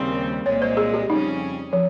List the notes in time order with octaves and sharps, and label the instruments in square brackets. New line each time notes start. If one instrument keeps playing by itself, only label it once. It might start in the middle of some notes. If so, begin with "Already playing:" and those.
Already playing: [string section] D#2 C#3 G3 C4
[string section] C2 A#2 G#3 [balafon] C#5
[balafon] C5
G#4
G4
[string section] F2 C#3 G3 C#4 G#4 [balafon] D#4
[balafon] F3